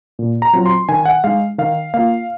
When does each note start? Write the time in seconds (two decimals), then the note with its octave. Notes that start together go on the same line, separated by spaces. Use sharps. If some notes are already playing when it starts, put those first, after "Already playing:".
0.19 A#2
0.42 A#5
0.53 F#3 C4 F4
0.66 C6
0.89 D#3 G#5
1.05 F#5
1.24 G#3 D#4 F5
1.58 D#3 F5
1.94 A#3 F4 F5